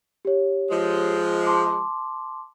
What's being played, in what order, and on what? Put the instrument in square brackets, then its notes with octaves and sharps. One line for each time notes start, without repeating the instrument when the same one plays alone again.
[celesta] G4 C#5
[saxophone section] F3 G#3
[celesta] A5 C6 D6